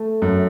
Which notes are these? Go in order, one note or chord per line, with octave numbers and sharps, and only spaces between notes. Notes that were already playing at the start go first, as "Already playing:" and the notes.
Already playing: A3
F#2